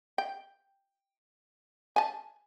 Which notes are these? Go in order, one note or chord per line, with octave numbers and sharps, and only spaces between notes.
G5
G#5 A5